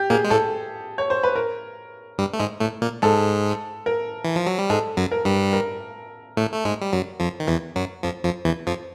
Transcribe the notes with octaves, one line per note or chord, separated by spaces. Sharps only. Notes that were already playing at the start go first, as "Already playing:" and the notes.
Already playing: G4
A#2 A#3 G#4
G#3
A2 A3 A4
C#5
C5
B4
A#4
G2 G3
A3
G#2 G#3
A2 A3
A#2 A#3
G#2 G#3 A4
A#4
E3
F3
F#3
G3
G#2 G#3 A4
F#2 F#3
A#4
G2 G3
A#4
A2 A3
A3
G#2 G#3
G3
F#2 F#3
F2 F3
D#3
E2 E3
F#2 F#3
F2 F3
F2 F3
E2 E3
F2 F3